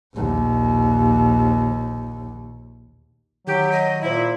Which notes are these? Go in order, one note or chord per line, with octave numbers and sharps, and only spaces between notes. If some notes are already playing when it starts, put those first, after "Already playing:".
A#1 D#2
D#3 F#3 G4
D#5
A#2 E4 C5 B5